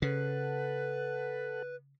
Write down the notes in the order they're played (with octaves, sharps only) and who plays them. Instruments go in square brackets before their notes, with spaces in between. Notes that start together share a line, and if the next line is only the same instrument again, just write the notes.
[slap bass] C#3 [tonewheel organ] A4 F#5 [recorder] B4